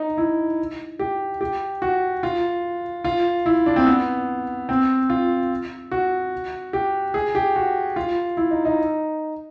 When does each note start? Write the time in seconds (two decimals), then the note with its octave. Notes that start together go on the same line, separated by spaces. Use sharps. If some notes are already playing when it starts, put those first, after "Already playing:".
Already playing: D#4
0.18 E4
0.99 G4
1.41 G4
1.82 F#4
2.23 F4
3.04 F4
3.46 E4
3.66 D4
3.76 C4
3.86 B3
4.69 C4
5.10 F4
5.91 F#4
6.73 G4
7.14 G#4
7.35 G4
7.56 F#4
7.96 F4
8.37 E4
8.51 D#4
8.65 D#4